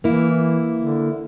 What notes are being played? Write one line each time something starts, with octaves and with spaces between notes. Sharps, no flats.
E3 A#3 E4
D3